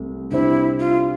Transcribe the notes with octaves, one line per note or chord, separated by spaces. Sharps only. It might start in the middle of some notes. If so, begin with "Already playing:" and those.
Already playing: C2 C3 A3
C3 G3 D4 E4 G4 C5
F4